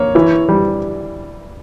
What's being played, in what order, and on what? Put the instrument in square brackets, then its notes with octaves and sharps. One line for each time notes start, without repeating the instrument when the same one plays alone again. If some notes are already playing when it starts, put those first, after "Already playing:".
Already playing: [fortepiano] A#3 [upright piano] C#5
[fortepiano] E3
G3